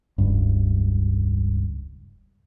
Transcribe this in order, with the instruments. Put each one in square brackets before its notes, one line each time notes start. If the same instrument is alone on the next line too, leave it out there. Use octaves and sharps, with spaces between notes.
[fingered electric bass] E1 C#2 G2